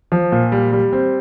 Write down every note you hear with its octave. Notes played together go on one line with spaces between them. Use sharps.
F3
A#2
G3
G3
C4